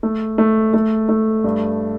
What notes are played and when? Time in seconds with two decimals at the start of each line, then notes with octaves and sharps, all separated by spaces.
0.03 A3
0.38 A3
0.74 A3
1.09 A3
1.44 G2